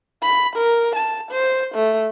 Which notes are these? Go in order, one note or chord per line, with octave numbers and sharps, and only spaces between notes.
B5
A#4
A5
C5
A3